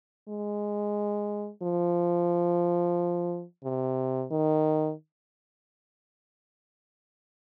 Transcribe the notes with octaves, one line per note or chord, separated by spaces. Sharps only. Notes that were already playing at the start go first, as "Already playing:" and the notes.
G#3
F3
C3
D#3